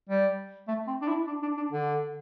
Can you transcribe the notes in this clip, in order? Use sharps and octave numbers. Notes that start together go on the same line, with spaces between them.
G3
A3
C4
D4
E4
D4
D4
D4
D3